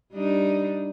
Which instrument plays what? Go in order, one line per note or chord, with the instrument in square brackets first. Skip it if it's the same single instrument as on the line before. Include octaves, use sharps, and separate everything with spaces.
[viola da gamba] G3 D4 D#4